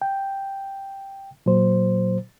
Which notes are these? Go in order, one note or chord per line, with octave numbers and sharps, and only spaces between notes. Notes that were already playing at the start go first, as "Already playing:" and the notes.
G5
A#2 F#3 C5